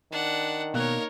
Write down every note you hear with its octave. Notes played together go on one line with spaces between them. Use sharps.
D#3 D4 F#5
B2 A#3 D#4 A#4 C#5 F#6